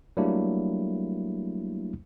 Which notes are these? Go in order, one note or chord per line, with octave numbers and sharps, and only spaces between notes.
F#3 G3 A3 A#3 D4 E4